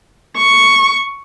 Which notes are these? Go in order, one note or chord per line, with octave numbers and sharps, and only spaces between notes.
C#6